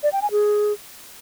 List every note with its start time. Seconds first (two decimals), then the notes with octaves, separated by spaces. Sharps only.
0.03 D5
0.13 G5
0.22 G#5
0.31 G#4